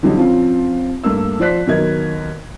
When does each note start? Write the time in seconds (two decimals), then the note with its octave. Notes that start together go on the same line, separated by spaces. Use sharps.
0.03 D3 E3 F#3 G3 C#4 D#4
0.16 F3 C4 C#4 F4
1.04 G2 A3 A#3 E6
1.40 F3 C5 D5 F#6 B6
1.67 D#2 F#3 B3 A#4 D#5 G#6